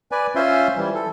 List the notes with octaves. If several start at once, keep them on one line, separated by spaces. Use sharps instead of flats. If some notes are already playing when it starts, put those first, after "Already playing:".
B4 D5 G#5
C#4 F4 C5 E5 G#5 C6
E3 G3
A4